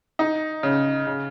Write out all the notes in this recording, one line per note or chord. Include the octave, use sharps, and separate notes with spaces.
D#4
C#3
C#3